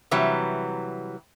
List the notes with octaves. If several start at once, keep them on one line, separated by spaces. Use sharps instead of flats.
C3 E3 F#3 G3